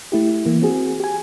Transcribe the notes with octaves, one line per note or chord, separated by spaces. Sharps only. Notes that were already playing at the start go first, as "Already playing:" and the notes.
A3 E4 G4
E3 A#3
C4 F#4 G#4
G4 G#5